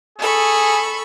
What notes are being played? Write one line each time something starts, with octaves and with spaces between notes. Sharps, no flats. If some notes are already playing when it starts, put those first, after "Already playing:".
G#4 A4 B5 C#6